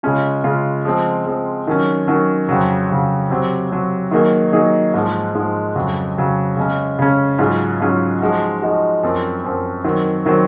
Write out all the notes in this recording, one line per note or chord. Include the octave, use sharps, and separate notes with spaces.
C#3 G#3 C#4 F4
C#3 G#3 C#4 F4
F3 G#3 C4
F3 G#3 C4
D#3 F#3 C#4
D#3 F#3 C#4
F2 C#3 F#3
F2 C#3 F#3
C3 F#3 C4
C3 F#3 C4
D#3 F#3 A#3 D#4 G#4
D#3 F#3 A#3 D#4 G#4
G#2 F3 G#3
G#2 F3 G#3
F2 C#3 F#3
F2 C#3 F#3
C#3 G#3 C#4
C#3 G#3 C#4
G#2 F#3 C#4 F4 G#4
G#2 F#3 C#4 F4 G#4
F3 G#3 D#4 F#4
F3 G#3 D#4 F#4
F#2 F3 C4
F#2 F3 C4
D#3 F#3 C4
D#3 F#3 C4